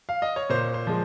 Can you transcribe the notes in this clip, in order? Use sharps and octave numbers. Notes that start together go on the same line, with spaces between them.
F5
D#5
C#5
A#2 C5
C5
F3 G#3